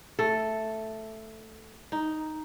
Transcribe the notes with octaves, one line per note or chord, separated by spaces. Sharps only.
A3 A4
D#4